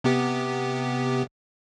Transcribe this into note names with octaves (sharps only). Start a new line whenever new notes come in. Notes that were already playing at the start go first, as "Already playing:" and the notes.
C3 B3 G4